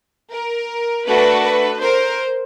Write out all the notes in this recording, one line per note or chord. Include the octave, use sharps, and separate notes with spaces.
A#4
A3 D4 F#4 A4 B4
B4
A#4 C5